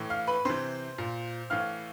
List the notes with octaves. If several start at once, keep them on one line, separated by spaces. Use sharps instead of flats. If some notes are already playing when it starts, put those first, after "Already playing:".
Already playing: A2 E3
F5 F6
B4 B5
C3 E3 C5 C6
A#2
A2 E3 F5 F6